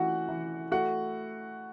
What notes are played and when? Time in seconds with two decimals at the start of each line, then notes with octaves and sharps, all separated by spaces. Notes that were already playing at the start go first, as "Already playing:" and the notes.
Already playing: E3 A3 C#4 F#4 F#5
0.29 E3
0.72 A3 F#4 F#5